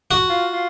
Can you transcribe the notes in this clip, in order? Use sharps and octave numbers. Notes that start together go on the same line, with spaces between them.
F#4
F4
F4